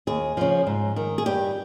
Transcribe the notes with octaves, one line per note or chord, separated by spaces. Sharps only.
D#2 G#4
C#3 F3
G#2
D#3
G#4
G2 G4